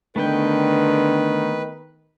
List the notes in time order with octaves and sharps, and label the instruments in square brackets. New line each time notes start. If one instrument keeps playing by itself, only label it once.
[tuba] D3 [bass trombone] D#3 [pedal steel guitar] A3 B3 G5 [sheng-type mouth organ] B4